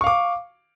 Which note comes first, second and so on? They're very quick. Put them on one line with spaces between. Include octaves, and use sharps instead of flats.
C#6 F5 D6